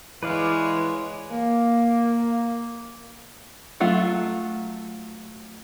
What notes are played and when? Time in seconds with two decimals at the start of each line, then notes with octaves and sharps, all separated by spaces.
0.23 E3 G#3 B4 C#5 D5 F5
1.31 A#3
3.80 F#3 A3 F4